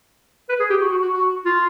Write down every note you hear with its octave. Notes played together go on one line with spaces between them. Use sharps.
B4
G#4
G4
F#4
F#4
F#4
F#4
F4